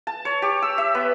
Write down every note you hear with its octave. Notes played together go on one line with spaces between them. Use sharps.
A5
C#5
G4
E6
E5
B3